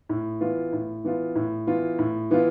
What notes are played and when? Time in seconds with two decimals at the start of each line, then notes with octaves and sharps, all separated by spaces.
0.09 A2
0.41 E3 B3 F4
0.72 A2
1.04 E3 B3 F4
1.36 A2
1.67 E3 B3 F4
1.99 A2
2.31 E3 B3 F4